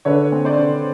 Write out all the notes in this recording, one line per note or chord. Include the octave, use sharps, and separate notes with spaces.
D3 B4 C#5
C4
C5 D5
D3